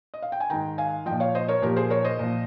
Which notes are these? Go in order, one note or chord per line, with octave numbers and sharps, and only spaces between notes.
D#5
F5
G5
G#5
G#2 D#3 G5 A#5
F5 G#5
A#2 F3 D#5 G5
C#5 F5
C5 D#5
A#4 C#5
A#2 F3 G4 A#4
G#4 C5
A#4 C#5
C5 D#5
A#2 F3